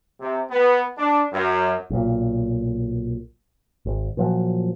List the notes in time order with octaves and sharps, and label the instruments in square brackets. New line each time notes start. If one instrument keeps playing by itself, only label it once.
[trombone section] C3
B3
D4
F#2
[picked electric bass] B1 A#2
G#1
A#2 F3 F#3